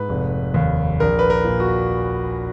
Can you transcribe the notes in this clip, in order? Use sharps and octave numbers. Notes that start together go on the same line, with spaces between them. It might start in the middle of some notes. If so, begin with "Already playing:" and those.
Already playing: G#2 B4
F1
D#2
A#1 A#4
B4
A#4
A#2
F#4